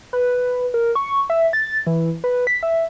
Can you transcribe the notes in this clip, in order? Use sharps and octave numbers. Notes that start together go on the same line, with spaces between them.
B4
A#4
C#6
E5
A6
E3
B4
B6
E5